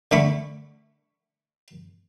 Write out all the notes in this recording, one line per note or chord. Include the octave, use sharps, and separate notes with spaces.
D3 A3 B5 C#6